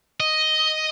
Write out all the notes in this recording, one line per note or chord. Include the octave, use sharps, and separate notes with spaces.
D#5